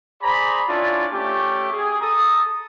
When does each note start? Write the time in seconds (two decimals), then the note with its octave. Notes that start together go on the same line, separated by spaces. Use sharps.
0.22 G#4 C5 D5 A#5 B5
0.68 C#4 D4 E4 F4 A4 D5
1.12 A3 C#4 G4
1.72 G#4
2.01 A4 A#5 D#6